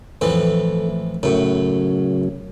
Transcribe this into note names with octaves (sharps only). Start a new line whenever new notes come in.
F2 A2 E3 A3
F#2 A2 C#3 F#3